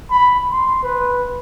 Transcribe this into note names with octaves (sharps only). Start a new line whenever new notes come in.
B5
C6
B4